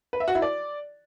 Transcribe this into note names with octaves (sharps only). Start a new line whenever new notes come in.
B4
E5
F#4
E4
D5